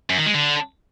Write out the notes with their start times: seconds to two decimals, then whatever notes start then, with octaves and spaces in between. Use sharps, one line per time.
0.10 F#2
0.18 D#3
0.26 G#3
0.34 D3